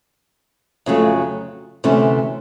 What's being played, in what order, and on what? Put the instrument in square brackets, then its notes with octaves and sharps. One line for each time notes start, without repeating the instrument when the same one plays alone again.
[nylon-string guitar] F2 C#3 F#3 A3
D2 C3 E3 A3 C#4